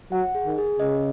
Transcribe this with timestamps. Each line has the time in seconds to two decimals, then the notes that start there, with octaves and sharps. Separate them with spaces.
0.12 F#3 F#5
0.35 G#4
0.46 D#3
0.58 G#4
0.80 C#3 D#5